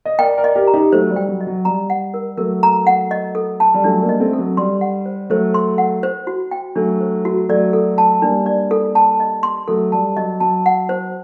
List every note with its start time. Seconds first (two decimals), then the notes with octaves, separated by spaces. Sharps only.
0.05 D#5
0.19 A#4 D5 G5
0.37 A#4 D5
0.44 D#5
0.55 G4 A#4
0.67 A#5
0.74 D#4 G4
0.92 F#3 A3 C5
1.10 G3
1.16 G5
1.29 F#3
1.41 D#5
1.47 F#3
1.65 G3 A#5
1.90 F#5
2.14 A#4
2.37 F#3 A3 A#4
2.63 A#5
2.87 F#5
3.11 D#5
3.35 A4
3.60 A5
3.74 G3
3.84 F#3 A3 D4
4.02 G3 A#3
4.09 D#5
4.20 A3 C4
4.33 A4
4.39 F#3
4.57 G3 C6
4.81 F#5
5.06 C5
5.30 F#3 A3 C5
5.54 C6
5.78 F#5
6.03 C5
6.27 F#4
6.51 G5
6.75 F#3 A3 D4
7.01 C5
7.25 F#4
7.49 F#3 A3 D5
7.73 A4
7.98 A5
8.21 G3 A#3 D4
8.46 D5
8.71 A4
8.95 A5
9.20 D#5
9.43 C6
9.68 F#3 A3 A4
9.92 G3 A5
10.17 F#3 D#5
10.40 F#3 A5
10.66 F#5
10.89 C5